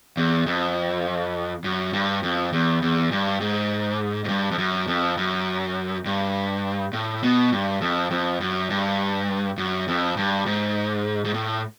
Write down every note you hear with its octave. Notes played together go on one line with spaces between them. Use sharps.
E2
F2
F#2
G2
F2
E2
E2
G2
G#2
G#2
G2
F2
F#2
F2
F#2
G2
A2
B2
G2
F2
F2
F#2
G2
F#2
F2
G2
G#2
G#2
A2